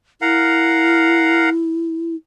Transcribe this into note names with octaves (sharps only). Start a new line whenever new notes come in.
E4 A#4 F5 F#5